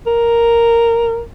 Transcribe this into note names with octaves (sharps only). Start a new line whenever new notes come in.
A#4